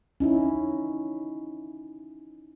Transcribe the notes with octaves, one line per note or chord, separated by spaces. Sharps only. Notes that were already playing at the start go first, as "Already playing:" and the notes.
C#4 D#4 E4